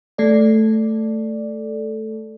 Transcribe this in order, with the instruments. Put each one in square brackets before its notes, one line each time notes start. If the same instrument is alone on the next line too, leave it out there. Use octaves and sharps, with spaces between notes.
[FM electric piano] A3 A4 D5